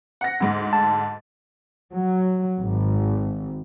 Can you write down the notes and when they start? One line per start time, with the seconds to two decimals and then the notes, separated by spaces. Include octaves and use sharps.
0.21 F#5 A#6
0.40 D2 G#2
0.73 A5
1.94 F#3
2.61 G#1